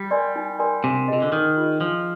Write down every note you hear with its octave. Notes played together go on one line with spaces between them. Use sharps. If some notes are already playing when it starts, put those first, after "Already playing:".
Already playing: G3
A#4 D5 G#5 C6
D#4
A#4 D5 G#5 C6
C3 D4
C3 F4 G#4 D#5
D3
D#3 D4
F4 G#4 D#5
F3 D4